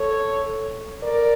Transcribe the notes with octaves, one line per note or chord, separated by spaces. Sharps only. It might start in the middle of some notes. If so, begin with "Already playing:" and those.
Already playing: A4 C#5
A#4 D5